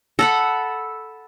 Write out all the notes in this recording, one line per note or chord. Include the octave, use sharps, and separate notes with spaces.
A4 F#5 B5